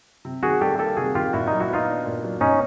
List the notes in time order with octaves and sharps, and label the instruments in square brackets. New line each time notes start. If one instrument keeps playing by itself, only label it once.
[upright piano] C3
[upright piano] D#3 [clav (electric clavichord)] F#4 G#4
[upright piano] G3 [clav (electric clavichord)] G4 A4
[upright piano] A#3 [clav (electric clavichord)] G4 A4
[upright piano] C3 [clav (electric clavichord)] F#4 G#4
[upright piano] D#3 [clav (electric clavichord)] F4 G4
[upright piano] A#2 [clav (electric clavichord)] E4 F#4
[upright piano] F#3 [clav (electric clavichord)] D#4 F4
[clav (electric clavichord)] E4 F#4
[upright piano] B3 [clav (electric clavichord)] D#4 F4
[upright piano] D4
A#2
F#3
[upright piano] B2 [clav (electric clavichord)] C#4 D#4